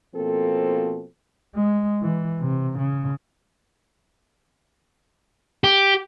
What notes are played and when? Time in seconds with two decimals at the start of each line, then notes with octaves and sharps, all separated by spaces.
0.15 B2 F3 A#3 C4 A4
1.55 G#3
2.02 E3
2.40 C3
2.78 C#3
5.64 G4